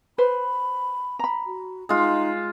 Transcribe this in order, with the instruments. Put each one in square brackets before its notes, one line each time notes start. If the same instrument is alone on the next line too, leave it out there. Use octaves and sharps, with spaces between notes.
[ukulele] B4 C5 [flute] B5
[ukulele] A#5 B5
[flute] F#4
[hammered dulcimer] G#3 F4 [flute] D#4